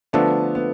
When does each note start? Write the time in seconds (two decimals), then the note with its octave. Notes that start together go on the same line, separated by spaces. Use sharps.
0.13 D3 F3 A3 B3 D4 A4
0.55 B3